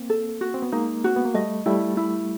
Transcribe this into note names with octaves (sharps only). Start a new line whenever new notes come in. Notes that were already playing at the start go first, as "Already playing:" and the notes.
Already playing: A#3 C4
A4
F#4
C4
B3
G#3 A#3 D#4
C4 F#4
B3
A#3
G3 A3 D#5
G3 A3 E4
E4